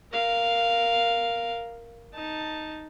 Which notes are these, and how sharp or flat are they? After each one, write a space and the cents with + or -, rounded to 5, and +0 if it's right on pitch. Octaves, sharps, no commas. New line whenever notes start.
A#4 +0 F5 +0
D#4 +0 A5 +0